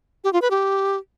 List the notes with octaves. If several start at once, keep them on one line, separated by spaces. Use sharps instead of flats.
G4
F4
B4
G4